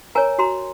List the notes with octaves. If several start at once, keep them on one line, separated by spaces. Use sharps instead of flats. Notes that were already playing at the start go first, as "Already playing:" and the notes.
A#4 C#5 G#5 A#5
F#4 A#5 C6